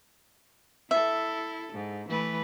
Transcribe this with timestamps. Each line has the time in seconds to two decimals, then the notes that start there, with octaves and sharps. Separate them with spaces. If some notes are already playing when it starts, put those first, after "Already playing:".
0.91 E4 A4 E5
1.73 G#2
2.09 E3 A3 B4